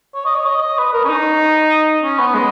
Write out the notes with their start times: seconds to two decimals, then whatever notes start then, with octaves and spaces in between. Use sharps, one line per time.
0.14 C#5
0.26 D#5
0.35 C#5
0.46 D#5
0.62 D#5
0.78 B4
0.93 A#4
1.05 C#4
1.09 D#4
2.03 C#4
2.19 B3
2.34 G#3